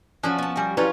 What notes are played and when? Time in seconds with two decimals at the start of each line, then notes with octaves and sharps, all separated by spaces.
0.23 F3 C#4 D4 F#4 G#5
0.39 B3 A5
0.56 G3 A#4 G5 G#5 D6
0.77 F#3 G3 C#4 E4 F4 A4 B4 C#5